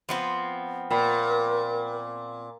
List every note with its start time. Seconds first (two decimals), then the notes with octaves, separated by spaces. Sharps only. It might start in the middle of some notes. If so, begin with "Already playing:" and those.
0.09 F3 B3 C4
0.91 A#2 A#4 G5 B5